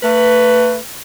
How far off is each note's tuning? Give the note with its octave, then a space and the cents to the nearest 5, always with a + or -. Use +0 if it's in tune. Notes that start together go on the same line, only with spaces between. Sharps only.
A3 +35 B4 +0